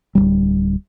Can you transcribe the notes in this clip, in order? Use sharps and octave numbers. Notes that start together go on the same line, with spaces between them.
D1 G1 G3